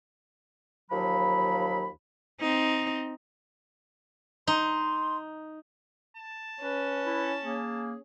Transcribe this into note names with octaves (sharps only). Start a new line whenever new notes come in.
D#2 F3 F#3 B5
C4 D#4
D#4 C6
A5
C#4 B4
E4
A#3 G#4